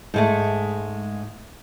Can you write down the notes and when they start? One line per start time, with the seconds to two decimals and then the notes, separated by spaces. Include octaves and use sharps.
0.14 G#2 G#3 A3